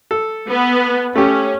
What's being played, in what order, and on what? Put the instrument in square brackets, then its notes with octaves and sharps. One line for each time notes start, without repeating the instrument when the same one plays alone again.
[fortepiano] A4
[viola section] B3
[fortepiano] A3 G4 [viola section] C#4